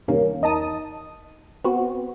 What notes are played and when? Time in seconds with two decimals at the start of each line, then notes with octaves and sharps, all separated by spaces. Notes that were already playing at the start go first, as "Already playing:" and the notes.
0.08 E2 G2 C3 D#3 A#3 C#4
0.42 E2 D#4 D#5 A5 D#6
1.64 B3 C4 F#4